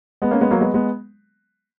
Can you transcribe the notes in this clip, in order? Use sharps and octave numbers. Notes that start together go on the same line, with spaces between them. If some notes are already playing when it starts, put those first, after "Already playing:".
G#3 B3
A#3 C#4
G#3 B3
F#3 A#3
G#3 B3
G#3 B3